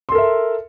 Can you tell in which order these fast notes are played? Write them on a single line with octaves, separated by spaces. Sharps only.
C6 A4 A#4 E5